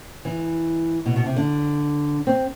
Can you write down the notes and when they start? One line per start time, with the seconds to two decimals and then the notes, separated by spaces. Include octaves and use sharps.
0.25 E3
1.06 B2
1.16 B2
1.26 C3
1.36 D3
2.27 C4